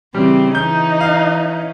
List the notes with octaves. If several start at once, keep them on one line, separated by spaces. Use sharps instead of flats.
C#3 E3 G3 C4
E3 C#4 D#4 G6
F5